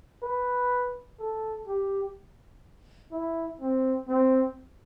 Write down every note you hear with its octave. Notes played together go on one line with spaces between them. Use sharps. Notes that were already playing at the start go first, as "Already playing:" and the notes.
B4
A4
G4
E4
C4
C4